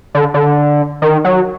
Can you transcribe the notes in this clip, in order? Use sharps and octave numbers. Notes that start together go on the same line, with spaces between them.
D3
D3
D#3
F#3